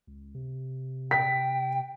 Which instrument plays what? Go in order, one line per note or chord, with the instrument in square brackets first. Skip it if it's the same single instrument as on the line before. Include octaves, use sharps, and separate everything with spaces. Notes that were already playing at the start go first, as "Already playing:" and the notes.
[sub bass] C#2
C3
[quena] G5 [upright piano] B6